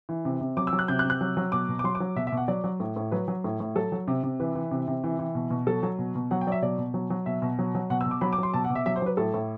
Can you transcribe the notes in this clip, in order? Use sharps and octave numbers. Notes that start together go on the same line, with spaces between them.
E3
C3
C3
F#3 D6
E6
F#3
F#6
C3 G6
F#6
C3
F#6
F#3
F#3
B2 D6
B2
D6
F#3 C6
D6
F#3
B2 E5
E5
B2
F#5
F#3 D5
F#3
A2
A2
F#3 B4
F#3
A2
A2
F#3 A4
F#3
C3
C3
E3 B4
E3
C3
C3
E3
E3
B2
B2
F#3 A4
F#3
B2
B2
F#3 F#5
G5
F#3 D5
E5
B2 D5
B2
F#3
F#3
B2 E5
B2
F#3
F#3
B2 F#5
E6
B2
D6
F#3 B5
D6
F#3 C6
B2 A5
F#5
B2
E5
F#3 E5
C5
F#3 B4
A2 A4
A2